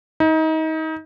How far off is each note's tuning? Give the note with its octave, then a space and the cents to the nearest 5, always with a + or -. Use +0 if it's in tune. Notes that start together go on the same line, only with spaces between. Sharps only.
D#4 +30